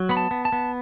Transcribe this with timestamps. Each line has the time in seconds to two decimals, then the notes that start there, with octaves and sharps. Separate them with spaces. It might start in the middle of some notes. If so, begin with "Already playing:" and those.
Already playing: F#3
0.09 B3 B5
0.17 A5
0.31 B3
0.45 A5
0.52 B3